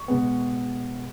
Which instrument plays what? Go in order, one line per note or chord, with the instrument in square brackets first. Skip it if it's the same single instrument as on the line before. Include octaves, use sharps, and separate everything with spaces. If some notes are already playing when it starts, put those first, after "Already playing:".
Already playing: [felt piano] C#6
B2 G#3 B3